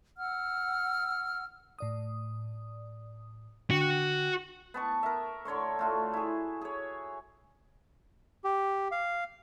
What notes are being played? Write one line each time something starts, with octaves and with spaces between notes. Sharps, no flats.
F#5 E6 F6
A2 D5 D#6
D3 D4 F#4 G5
B3 A5 C#6
A#4 E5
D3 C#5 C6 C#6
A3 F4 F#4
E4 G#4
G#4 C#5
G4
F5